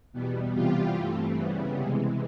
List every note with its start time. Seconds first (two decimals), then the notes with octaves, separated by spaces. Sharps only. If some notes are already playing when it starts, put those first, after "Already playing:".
0.13 E2 B2 G3 B3
0.54 C3 E3 G3 B3 F4 G4
0.95 G2 E3 A3 C4
1.36 C#3 E3 G3 B3
1.77 C3 E3 G#3